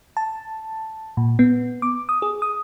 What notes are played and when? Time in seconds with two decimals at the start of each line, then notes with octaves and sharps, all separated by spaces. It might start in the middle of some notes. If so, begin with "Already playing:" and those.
0.17 A5
1.17 A#2
1.39 B3
1.82 D6
2.09 D#6
2.22 G#4
2.42 D#6